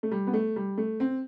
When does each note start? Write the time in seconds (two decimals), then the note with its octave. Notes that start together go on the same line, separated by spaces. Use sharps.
0.03 A3
0.11 G3
0.27 B3
0.33 A3
0.56 G3
0.78 A3
1.00 C4